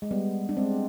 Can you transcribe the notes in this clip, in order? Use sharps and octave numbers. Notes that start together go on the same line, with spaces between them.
G#3
G3 B3
D4
G#3 C4